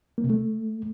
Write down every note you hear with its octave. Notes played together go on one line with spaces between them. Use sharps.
A#3
C3
A3